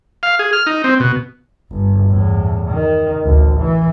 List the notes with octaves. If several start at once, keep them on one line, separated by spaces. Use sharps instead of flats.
F5
G#4
F6
D#4
C4
B2
G1
E2 A2
D#3
A1 D2
E3